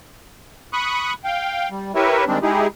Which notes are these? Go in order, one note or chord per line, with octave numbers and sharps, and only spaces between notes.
B5 C#6 D#6 F#6
F5 G5
G3
E4 G4 A#4 B4 C#5 E5
D#3 G3 G#3 C4 D4
G#3 D#4 E4 G4 G#4